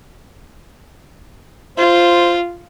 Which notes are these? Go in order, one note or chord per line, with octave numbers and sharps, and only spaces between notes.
F4 C5